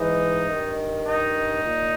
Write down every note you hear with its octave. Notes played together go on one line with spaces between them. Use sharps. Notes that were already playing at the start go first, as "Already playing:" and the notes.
Already playing: G#2 E3 D#4
G2 D#3
D#4
A#2